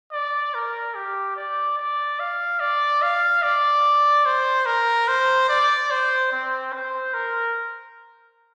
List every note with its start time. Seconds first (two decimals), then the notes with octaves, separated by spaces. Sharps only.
0.12 D5
0.54 A#4
0.95 G4
1.36 D5
1.78 D5
2.20 F5
2.60 D5
3.02 F5
3.43 D5
4.26 C5
4.66 A#4
5.08 C5
5.49 D5
5.91 C5
6.32 C4
6.73 C5
7.14 A#4